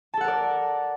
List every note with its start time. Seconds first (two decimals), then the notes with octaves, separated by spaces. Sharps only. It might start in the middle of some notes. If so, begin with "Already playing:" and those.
0.14 A5
0.17 A4
0.21 F#5
0.24 A#4
0.28 D5